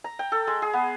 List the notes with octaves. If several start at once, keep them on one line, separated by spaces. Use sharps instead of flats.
A#5
G5
A4
G#3
G#4
B3